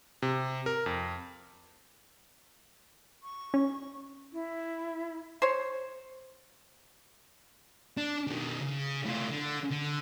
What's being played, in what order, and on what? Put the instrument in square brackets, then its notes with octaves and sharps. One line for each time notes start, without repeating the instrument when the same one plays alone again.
[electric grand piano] C3
A#4
F2
[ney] C#6
[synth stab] C#4
[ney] E4
[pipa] C5 C#5
[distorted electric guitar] D4
B2 D#3
C#3
A2 F4
D3
D3